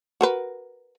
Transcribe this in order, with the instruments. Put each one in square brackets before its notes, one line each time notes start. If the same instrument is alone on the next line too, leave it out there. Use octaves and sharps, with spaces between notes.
[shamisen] F#4 A#4 B4